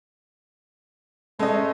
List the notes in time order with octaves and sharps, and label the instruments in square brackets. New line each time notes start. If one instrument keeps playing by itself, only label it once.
[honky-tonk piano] G#3 C#4 D#5 [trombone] A3